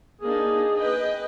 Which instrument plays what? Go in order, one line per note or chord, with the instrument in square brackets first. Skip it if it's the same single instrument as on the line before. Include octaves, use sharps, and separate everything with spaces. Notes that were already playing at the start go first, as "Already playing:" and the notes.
[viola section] A#3 D4 D#4 [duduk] G#4
[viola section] B4 D#5 G5